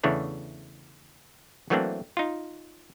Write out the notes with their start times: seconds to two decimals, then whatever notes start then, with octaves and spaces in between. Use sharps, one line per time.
0.03 E2 C#3 E3 A3 D4 C#5
1.70 E3 F#3 A3 A#3 C4 D4
2.17 D#4 F4